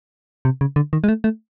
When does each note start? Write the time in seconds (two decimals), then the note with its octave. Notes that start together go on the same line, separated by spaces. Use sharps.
0.45 C3
0.61 C#3
0.76 D3
0.93 D#3
1.04 G#3
1.08 A3
1.24 A3